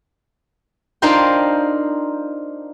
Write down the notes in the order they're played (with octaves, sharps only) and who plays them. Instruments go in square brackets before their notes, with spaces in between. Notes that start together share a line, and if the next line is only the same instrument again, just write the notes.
[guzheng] D4 D#4 F4 A#4 C5 G5